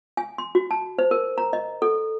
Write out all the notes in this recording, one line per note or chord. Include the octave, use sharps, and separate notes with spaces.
G#5
C6
F#4
A5
C5
A#4
A#5
D#5
A4